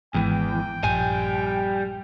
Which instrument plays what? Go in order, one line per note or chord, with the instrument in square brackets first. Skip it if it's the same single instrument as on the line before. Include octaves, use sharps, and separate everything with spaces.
[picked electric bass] G#1 G#3 [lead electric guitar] E2 E3 [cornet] G5
[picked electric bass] A#1 G2 F3 [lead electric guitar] G3 G#5